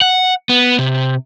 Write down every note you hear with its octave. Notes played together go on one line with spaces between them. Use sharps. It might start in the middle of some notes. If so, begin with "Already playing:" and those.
F#5
B3
C3